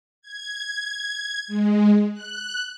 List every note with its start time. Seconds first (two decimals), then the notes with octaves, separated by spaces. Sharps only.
0.22 G#6
1.48 G#3
2.13 F#6